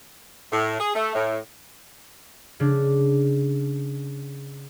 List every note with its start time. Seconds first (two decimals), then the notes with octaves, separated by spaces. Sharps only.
0.51 A2
0.79 G#4
0.94 A3
1.15 A2
2.60 C#3 D4